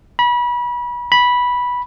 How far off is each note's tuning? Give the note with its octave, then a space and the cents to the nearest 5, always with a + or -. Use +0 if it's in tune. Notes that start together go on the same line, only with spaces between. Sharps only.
B5 -30
B5 -10